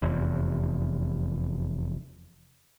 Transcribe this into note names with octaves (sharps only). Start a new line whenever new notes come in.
F1 E2